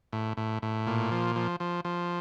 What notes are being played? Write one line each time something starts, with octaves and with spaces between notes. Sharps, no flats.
A2
A2
A2
A#2
F3
F3
F3
F3